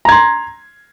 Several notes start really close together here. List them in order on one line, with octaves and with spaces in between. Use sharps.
A#5 G#6 C6